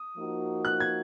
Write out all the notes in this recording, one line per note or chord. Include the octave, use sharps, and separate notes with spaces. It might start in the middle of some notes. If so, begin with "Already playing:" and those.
Already playing: D#6
F3 A#3 D#4 F#4
F#6
G#6